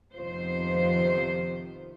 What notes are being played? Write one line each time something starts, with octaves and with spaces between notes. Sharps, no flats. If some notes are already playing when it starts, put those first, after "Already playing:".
F2 C3 D#3 B3 F4 C5